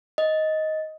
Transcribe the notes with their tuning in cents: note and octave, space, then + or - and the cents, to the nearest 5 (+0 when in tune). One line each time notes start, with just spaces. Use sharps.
D#5 +10